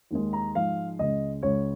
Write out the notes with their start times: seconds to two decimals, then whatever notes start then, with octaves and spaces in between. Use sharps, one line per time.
0.11 D#2 D#3 G#3
0.33 A#5
0.55 G#2 F3 G#3 F5
0.99 C#2 C#3 G#3 D#5
1.43 C#2 C#3 G#3 C#5